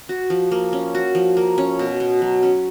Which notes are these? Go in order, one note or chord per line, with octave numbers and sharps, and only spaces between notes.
F#4
F3
A#3
C#4
F#4
F3
A#3
C#4
B2
B2
F#3
C#4